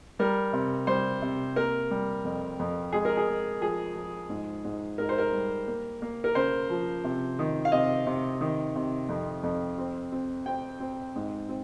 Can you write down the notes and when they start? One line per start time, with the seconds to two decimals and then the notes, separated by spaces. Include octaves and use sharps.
0.19 G3 A#4
0.53 C3
0.87 G3 C5
1.22 C3
1.56 A#3 A#4
1.91 G3
2.25 F2
2.59 F2
2.93 G#3 G#4
3.05 A#4
3.17 G#4
3.27 G#3
3.61 F3 G#4
3.95 F3
4.29 G#2
4.64 G#2
4.98 G#2 A#4
5.09 C5
5.18 A#4
5.32 G3
5.67 A#3
6.02 A#3
6.24 A#4
6.35 C#3 C5
6.70 F3
7.04 C3
7.39 D#3
7.65 F5
7.72 C3 D#5
8.06 C3
8.41 D#3
8.75 C3
9.09 F2
9.43 F2
9.78 C4
10.12 C4
10.46 C4 G5
10.80 C4
11.16 G#2
11.49 C4